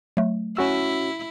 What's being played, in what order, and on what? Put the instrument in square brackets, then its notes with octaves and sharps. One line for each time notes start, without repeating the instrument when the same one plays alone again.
[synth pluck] F#3 A3
[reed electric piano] C#4 F#4 E6 [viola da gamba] E4